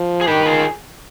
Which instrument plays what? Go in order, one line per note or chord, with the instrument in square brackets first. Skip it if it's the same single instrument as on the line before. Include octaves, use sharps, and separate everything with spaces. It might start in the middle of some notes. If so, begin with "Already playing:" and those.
Already playing: [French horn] F3
[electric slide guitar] G#4
[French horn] D#3 [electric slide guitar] G4 B4
[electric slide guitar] F4 G#4